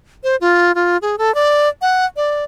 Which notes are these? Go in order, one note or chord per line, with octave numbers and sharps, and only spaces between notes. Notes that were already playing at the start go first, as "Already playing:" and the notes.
C5
F4
F4
G#4
A4
D5
F#5
D5